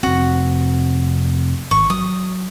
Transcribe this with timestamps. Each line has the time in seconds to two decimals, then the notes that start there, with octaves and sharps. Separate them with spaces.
0.03 F1 C4 F#4
1.71 G#1 C#6
1.90 F#3 D#6